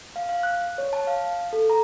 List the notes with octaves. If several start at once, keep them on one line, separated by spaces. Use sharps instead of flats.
F5
F5
F#6
C#5
A5
F5
A4
A#5